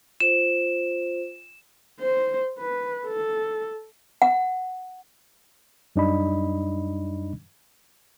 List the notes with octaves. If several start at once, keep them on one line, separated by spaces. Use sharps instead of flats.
F4 C5 E7
C5
B4
A4
F#5
F#2 G3 D4 D#4 D#5 B5